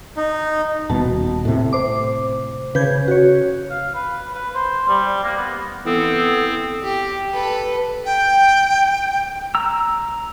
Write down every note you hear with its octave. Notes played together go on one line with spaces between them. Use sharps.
D#4
D#1 B2 A5
A2 C3
C5 D6
C#3 B4 G6 G#6
F#4 C#5
F5
B4
B4
C5
G3
A#3
B3
E3 B3 C4 A4
G4
A4 B4
G5
A#5 E6